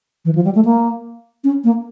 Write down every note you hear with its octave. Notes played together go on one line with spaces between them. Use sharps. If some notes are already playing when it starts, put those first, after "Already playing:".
E3
F3
G3
A3
A#3
C#4
A#3